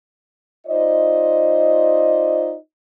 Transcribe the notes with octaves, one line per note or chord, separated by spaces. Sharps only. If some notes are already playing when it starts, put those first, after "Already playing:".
D#4 F4 C5 D5 D#5